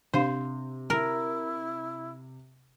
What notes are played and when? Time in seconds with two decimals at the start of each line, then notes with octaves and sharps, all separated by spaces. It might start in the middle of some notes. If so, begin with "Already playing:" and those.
0.14 C3 D4 C5 F5
0.90 E4 A#4